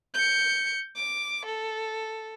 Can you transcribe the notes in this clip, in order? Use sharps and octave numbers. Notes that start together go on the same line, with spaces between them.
G6 C#7
D6
A4